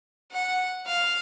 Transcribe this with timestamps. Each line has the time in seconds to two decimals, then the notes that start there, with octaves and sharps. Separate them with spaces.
0.32 F#5
0.86 F5